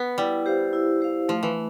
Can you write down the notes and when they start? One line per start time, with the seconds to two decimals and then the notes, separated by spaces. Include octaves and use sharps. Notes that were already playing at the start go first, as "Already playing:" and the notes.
Already playing: B3
0.18 G3 E4
0.46 G4 C5 F5
0.73 E4
1.01 G4 C5 F5
1.29 F3 A3
1.43 E3